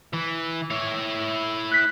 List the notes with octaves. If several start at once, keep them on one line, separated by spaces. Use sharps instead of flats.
E3
E4 C#5
F#6 B6